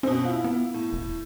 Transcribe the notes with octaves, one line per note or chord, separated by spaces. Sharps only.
B2 C4 C#4
E4 F4
B3
A2
E1